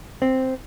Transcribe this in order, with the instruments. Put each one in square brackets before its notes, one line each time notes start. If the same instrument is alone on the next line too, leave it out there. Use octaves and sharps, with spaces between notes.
[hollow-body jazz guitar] C4